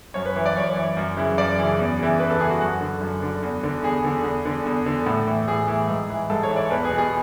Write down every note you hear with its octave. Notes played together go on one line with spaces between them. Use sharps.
F#2 C#5
B4
E3
D5
F#2 C#5
E3
F#2
C#3 E3
F#2 D5
C#3 E3
E2
C#3 E3
E2 B4
A4
C#3 E3 G#4
F#4
F#2 F#4
D3
F#2
D3
E2
D3
E2 G#4
D3
E2
D3
E2
D3
A2
E3
A2 G#4
E3
G#2
E3
G#2 A4
C#5
E3
D5
E2 B4
G#4
B2
G#4